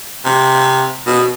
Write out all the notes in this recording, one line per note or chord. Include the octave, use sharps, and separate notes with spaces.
C3
B2